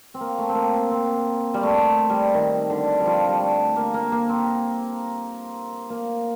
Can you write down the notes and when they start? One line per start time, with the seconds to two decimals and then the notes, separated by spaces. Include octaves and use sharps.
0.14 C4
0.20 A#3
0.38 A3
0.49 C4
0.55 A#3
0.74 C4
0.91 C4
1.54 G3
1.63 A3
2.10 G3
2.34 D#3
2.70 D3
3.00 G3
3.05 F3
3.29 G3
3.41 A3
3.76 A#3
3.94 A#3
4.12 A#3
4.29 C4
5.90 A#3